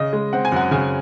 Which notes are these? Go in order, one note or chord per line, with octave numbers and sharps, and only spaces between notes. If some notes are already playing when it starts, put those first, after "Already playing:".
Already playing: C#3 D#5
G#3
C4 F#5
G#5
F#2 F#5
C#3 G#5